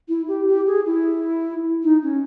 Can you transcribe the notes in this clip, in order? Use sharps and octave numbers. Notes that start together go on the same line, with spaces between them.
E4
G4
G4
G#4
E4
D#4
C#4